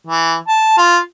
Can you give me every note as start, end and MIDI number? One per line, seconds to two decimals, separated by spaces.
0.07 0.35 52
0.48 0.76 81
0.78 0.98 65